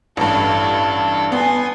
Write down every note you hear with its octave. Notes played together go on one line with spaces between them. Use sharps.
A1 G2 D4 A4
B3 G#5 C6